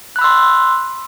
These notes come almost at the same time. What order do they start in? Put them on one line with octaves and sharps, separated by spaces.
F#6 B5 E6 C6